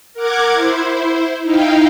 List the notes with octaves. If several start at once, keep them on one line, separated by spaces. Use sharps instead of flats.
A#4 F#5 D6 G#6
E4 C5
D#4 E4 F5 G5